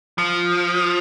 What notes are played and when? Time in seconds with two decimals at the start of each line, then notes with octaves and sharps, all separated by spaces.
0.18 F3